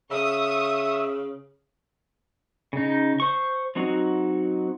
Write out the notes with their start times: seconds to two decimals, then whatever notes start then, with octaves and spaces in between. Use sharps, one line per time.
0.11 C#3 E5 C#6 D#6
2.73 C#3 D#4
3.20 C5 C#6
3.75 F#3 C4 D#4 F#4